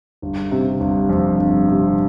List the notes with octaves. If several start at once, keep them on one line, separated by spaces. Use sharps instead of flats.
G1
C3
G1
F2
G1
C3